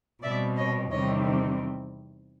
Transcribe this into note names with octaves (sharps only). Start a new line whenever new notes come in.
B2 G3 C4 D5 E5
C#5 D#5
E2 C3 D#3 G3 C4 C#5 D#5